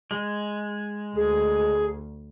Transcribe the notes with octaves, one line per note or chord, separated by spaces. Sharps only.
G#3
D2 G#4